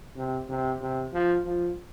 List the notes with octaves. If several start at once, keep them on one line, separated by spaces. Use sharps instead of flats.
C3
C3
C3
F3
F3